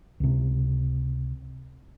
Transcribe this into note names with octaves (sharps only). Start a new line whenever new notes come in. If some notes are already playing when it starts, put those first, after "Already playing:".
C#2 C3